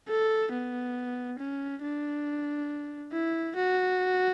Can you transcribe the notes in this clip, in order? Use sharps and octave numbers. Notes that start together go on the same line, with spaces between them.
A4
B3
C#4
D4
E4
F#4